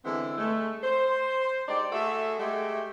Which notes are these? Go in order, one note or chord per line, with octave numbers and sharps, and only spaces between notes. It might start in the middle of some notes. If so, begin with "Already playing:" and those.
D3 E3 G#3 B3 C4 E4
G#3 A3
C5
G#3 D#4 G4 C5 D5
A3 F#4 G#4 A4 E5
G#3 A3 G4